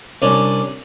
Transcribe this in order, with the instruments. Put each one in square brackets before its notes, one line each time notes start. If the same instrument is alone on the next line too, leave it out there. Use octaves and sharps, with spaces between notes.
[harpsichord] C2 C#4 D4